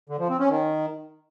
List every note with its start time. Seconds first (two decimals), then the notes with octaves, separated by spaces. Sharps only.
0.10 D3
0.19 F3
0.29 C4
0.39 C#4
0.49 D#3